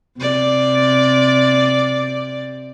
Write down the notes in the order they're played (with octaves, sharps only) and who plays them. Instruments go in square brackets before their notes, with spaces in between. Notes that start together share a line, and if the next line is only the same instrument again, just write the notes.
[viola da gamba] C3 D5